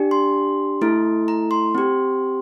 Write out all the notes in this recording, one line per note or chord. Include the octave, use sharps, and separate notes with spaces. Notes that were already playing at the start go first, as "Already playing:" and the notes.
Already playing: D4 G4
C6
A3 E4 A4
A#5
C6
C4 G4